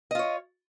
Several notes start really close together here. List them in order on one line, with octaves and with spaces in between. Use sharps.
D#5 F4 C#5